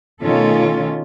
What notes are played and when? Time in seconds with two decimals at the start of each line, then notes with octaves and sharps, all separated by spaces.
0.23 B2 D#3 A3 C#4 F4 A4